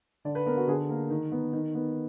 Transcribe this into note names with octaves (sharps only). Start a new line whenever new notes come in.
D3 D5
B4
B3 A#4
F#4
D3 G#4
A#3 A#4
D#3
B3
D#3
B3